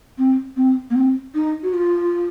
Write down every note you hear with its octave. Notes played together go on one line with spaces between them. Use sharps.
C4
C4
A#3
C4
D#4
F#4
F4